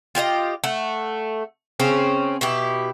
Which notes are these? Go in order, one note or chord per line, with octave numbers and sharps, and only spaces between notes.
F4 G4 C#5 D#5
A3 F#5
C#3 C4 C#4
B2 E4 G4